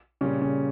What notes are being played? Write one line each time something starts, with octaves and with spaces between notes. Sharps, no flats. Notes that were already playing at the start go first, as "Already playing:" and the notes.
A#2 C#3 G3 C#4
C#3 C#4